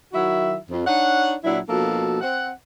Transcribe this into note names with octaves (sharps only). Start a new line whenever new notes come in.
D#3 F#3 E4 F#4 E5
F2
D4 D#4 C#5 F#5
A#2 F#3 D4 E4
B2 F3 A#3 D4 F#4 A4
C4 F#5